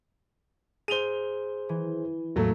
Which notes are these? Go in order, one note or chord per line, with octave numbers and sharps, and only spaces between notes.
G#4 C5 D#7 F7 G7
E3
E2 A2 F#3 A3 A#3